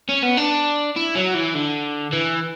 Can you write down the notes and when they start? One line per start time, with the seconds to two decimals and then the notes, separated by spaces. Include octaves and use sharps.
0.09 C#4
0.23 B3
0.37 D4
0.96 E4
1.16 F#3
1.34 E3
1.55 D3
2.13 E3